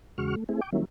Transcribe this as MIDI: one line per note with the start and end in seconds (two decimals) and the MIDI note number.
0.18 0.35 40
0.18 0.35 49
0.18 0.35 56
0.18 0.35 66
0.18 0.35 85
0.18 0.35 89
0.36 0.44 57
0.49 0.61 57
0.49 0.61 60
0.49 0.61 64
0.49 0.61 68
0.61 0.70 79
0.61 0.70 86
0.72 0.85 51
0.72 0.85 54
0.72 0.85 55
0.72 0.85 58
0.72 0.85 61
0.72 0.85 64